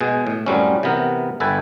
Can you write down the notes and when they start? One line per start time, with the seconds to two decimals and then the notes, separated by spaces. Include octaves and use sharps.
0.01 B2 G#3 G#4
0.27 A2
0.46 F#2 A2 F#3 G3 C4 C#4
0.83 C3 E3 B3 A#4
1.40 G1 A4 B4 G5 G#5